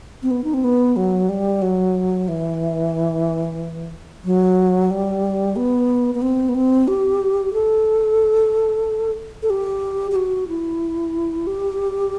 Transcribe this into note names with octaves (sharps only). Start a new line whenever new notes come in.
C4
B3
D#4
C4
B3
F#3
G3
F#3
E3
F#3
G3
B3
B3
C4
B3
C4
G4
A4
A4
G4
G4
F#4
E4
G4